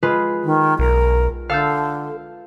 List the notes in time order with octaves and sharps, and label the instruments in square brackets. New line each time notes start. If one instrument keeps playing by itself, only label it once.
[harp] G#3 F4 B4
[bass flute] D#3
[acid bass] B1 [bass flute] A#4
[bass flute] D3 [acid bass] A4 [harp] F5 E6 G6